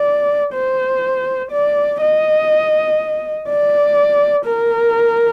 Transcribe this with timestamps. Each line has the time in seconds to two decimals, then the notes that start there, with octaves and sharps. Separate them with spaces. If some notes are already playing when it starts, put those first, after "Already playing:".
Already playing: D5
0.54 C5
1.51 D5
2.01 D#5
3.48 D5
4.45 A#4